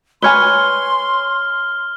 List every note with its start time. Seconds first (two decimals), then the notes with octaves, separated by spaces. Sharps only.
0.22 B4 C#5 G#5 C6 F6 G7